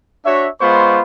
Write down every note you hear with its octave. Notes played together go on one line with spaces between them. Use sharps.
D4 F#4 C#5 E5
G#3 B3 F4 C5 B5 C#6